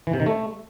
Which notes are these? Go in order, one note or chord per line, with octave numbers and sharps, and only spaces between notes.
E3
C3
D#3
A3